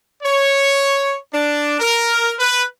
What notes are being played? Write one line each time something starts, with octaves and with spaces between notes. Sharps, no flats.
C#5
D4
A#4
B4